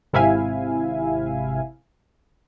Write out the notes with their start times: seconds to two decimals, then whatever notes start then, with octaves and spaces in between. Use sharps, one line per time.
0.13 G#1 C3 E4 E5 F5 G#5